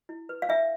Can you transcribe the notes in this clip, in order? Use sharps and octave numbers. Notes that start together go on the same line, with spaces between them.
E4
B4
F5
D4 E5